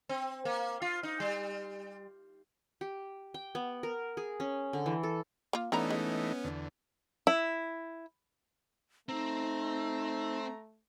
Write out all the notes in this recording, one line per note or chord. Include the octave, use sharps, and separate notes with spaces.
C4
A#3
F4
D#4
G3
G4
G5
B3
A#4
G#4
C#4
D3
E3
A4
A#3 F4
D3 E3 A3 B3 C#4 D#4 E4 A#5
G#3
E2 D3
E4
A3 C4 D#4 A#5